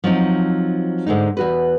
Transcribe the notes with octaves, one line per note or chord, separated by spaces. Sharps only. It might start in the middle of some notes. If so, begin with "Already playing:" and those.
F3 F#3 C4 D#4
G#2 D3 G#3 D#4
E2 F#4 B4